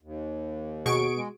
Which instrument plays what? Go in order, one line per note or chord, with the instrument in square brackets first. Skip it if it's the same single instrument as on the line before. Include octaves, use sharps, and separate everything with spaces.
[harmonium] D#2
[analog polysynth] B2 C#6 D7 [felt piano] F#4 G#4
[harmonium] G#3